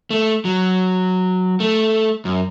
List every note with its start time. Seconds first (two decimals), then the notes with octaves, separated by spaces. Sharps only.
0.11 A3
0.45 F#3
1.60 A3
2.25 F#2